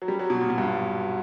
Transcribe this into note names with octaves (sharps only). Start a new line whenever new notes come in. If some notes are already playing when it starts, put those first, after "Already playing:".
F#3
G3
F#3
B2
A#2
B2
G2